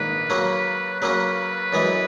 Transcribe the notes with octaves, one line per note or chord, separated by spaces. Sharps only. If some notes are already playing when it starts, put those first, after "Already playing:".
Already playing: A#1 G#2 D#3 A#3 B4
C#3 F#3 A#3 C#4
C#3 F#3 A#3 C#4 B4
F#2 E3 G#3